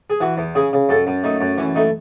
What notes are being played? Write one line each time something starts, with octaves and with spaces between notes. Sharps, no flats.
G#4
E3 F#4
E2
C#3 G#4
C#3
F#2 A4
F#2
A3 D#4
F#2
E3 C#4
A3 D#4